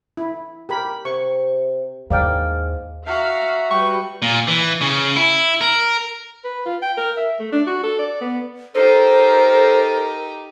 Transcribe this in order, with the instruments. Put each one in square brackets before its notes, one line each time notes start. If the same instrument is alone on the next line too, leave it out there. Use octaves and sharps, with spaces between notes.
[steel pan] E4
G4 A#4 B5
[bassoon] C3 [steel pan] C#6
[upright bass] D#2 E4 [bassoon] G#2 [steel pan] A#4 D5 G5 [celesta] F5 F6
[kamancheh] F#4 A#5 [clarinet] E5 [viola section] F5
[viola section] G3 F#4 B4 [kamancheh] G5 [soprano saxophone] C#6
[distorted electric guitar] A#2
E3
C#3
E4
A#4
[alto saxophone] B4
F4
G5
A#4
E5
A3
D4
F#4
A4
D5
B3
[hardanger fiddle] D#4 G4 [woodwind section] A4 A#4 [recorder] C5